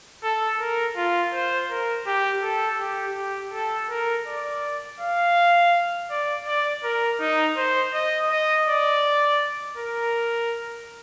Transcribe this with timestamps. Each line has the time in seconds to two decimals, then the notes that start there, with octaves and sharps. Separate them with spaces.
0.24 A4
0.60 A#4
0.97 F4
1.34 C5
1.71 A#4
2.07 G4
2.43 A4
2.81 G4
3.17 G4
3.54 A4
3.90 A#4
4.27 D5
5.00 F5
6.10 D5
6.47 D5
6.84 A#4
7.21 D#4
7.57 C5
7.94 D#5
8.31 D#5
8.67 D5
9.77 A#4